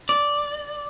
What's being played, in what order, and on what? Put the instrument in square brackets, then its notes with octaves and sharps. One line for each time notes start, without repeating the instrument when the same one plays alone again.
[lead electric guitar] D5